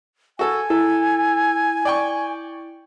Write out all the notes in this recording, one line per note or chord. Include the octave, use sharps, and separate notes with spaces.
F#4 A4 G#5
E4 A4
D5 G5 C#6